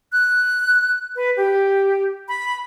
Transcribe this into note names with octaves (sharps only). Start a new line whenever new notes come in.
F#6
B4
G4
B5